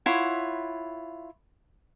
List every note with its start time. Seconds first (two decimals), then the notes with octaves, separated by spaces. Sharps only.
0.06 E4 F4 C#5 F#5